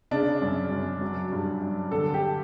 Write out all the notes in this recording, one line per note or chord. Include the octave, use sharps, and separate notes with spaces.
C#3 D4
F#2
F#2
F#3
G2
F#3
D3 A4
G4